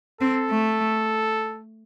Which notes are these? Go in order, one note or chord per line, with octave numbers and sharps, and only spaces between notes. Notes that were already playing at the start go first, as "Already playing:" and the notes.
C4 A4
A3